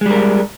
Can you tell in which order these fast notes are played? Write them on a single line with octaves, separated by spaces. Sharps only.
G#3 G3 A#4